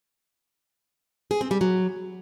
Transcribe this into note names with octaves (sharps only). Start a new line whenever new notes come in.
G#4
C4
G3
F#3